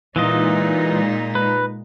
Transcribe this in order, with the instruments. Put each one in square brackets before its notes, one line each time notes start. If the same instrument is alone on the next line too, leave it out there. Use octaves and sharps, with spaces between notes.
[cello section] A#2 G#3 D#4 [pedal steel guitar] E3 F4 D#5
[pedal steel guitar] B4